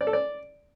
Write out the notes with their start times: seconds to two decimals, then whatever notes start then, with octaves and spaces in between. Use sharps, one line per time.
0.01 D5
0.07 A4
0.13 D5